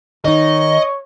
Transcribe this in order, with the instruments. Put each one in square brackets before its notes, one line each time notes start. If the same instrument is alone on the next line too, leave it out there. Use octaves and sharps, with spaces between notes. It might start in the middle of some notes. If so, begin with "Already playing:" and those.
[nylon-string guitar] D#3 D#4 [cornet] C#5 [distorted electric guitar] D#5